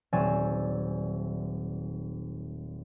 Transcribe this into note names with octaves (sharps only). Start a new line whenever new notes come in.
D#1 F#3 C4 D5 G#5 E6